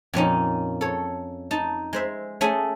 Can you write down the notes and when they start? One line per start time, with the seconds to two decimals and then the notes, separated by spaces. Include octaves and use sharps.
0.13 F2 A#2 C#4 D#4
0.81 A4 C#5
1.51 D#4 A5
1.93 G#3 C5 E5
2.41 A3 C#4 G#4 A4 G#5